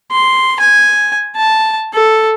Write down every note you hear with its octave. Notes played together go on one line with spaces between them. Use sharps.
C6
G#5
A5
A4